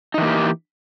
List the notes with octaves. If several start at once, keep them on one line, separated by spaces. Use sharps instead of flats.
E3 A#3 D#4 G4